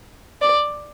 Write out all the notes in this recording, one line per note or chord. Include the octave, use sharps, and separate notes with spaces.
D5